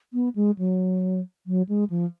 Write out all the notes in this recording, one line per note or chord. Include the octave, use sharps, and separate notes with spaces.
B3
G#3
F#3
F#3
G#3
F3